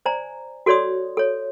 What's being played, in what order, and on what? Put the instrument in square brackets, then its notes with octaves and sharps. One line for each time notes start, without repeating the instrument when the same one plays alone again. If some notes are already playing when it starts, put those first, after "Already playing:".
[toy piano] C5 D5 G#5 A#5
F#4 A4 C#5 D5 C6 D#6
A4 C#5